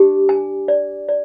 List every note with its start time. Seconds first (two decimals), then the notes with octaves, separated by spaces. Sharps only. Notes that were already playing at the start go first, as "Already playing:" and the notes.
Already playing: D4 G4
0.29 G#5
0.68 D5
1.08 D5